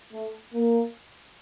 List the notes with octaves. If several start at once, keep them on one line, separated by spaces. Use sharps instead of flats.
A3
A#3